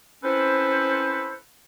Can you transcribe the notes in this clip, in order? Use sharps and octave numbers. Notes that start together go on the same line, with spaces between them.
C4 C#4 E4 A4 B4 C5